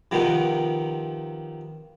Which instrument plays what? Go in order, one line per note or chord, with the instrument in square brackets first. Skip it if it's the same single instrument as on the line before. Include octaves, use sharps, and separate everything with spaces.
[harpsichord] C3 D#3 F3 B3 D#4